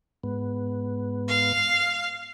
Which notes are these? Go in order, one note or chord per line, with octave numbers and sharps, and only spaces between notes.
G#2 B3
F5